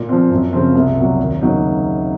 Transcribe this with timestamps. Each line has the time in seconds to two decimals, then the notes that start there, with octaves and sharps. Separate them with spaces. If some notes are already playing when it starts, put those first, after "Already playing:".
Already playing: A#2
0.09 F3 C4
0.31 F#2
0.53 C#3 F3 C4
0.75 C2
0.97 A#2 F#3
1.19 D#2
1.41 C#3 F#3 A#3 D#4